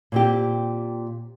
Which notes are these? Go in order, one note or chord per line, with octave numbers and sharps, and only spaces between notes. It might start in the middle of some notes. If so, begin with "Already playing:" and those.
A#2 C4 G4